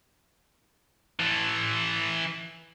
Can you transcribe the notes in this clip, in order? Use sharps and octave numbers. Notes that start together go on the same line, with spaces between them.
E3 A4